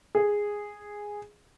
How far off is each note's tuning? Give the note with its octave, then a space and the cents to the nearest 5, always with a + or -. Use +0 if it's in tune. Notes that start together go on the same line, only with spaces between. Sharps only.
G#4 -5